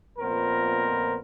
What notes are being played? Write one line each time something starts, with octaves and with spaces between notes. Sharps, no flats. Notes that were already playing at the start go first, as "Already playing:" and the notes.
F2 A#2 B3 A#4 C5